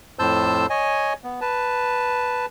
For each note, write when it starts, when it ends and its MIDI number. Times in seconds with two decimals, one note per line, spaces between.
0.19 0.66 41
0.19 0.66 45
0.19 0.66 72
0.19 0.66 81
0.19 0.66 88
0.19 0.66 91
0.70 1.13 73
0.70 1.13 75
0.70 1.13 80
1.24 1.40 59
1.41 2.46 71
1.41 2.46 81